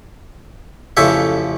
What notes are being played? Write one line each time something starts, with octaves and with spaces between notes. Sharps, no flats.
A1 F2 C#3 A4 E5